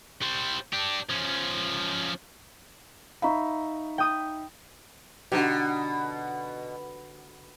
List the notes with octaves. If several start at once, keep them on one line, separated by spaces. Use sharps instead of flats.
G3 C5
D4 G4
F3 C#4
D#4 E5 F5 A#5 B5 C#6
G5 D#6 D#7
B2 D3 D#4 G4